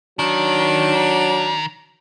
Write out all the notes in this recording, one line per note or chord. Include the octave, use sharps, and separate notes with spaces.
D#3 F#3 D4